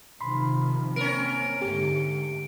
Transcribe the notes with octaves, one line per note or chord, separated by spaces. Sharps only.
C3 D#3 F3 B5 C6
A#3 C4 C#4 A#4 D7
G#2 D3 A3 G4